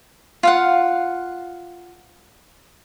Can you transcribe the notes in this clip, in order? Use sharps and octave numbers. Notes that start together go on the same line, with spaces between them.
F4 F5 F#5